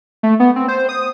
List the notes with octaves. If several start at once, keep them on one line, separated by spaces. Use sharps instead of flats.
A3
B3
C4
C5
D#6